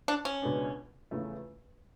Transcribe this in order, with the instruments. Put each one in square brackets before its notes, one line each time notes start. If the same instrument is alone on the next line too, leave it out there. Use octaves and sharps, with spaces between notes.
[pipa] D4
C#4
[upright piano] C#2 B2 G#3 B3 D4
E2 C#3 F3 A3